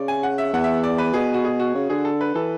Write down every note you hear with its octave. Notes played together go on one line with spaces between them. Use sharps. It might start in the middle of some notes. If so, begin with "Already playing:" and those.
Already playing: C#3 D5
G#5
F#5
E5
E2 F#5
E5
D5
B4
B2 G#4
F#4
G#4
F#4
C#3
D3 G#4
A4
B4
E3 A4